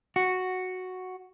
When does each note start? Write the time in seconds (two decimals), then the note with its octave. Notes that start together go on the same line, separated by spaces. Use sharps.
0.16 F#4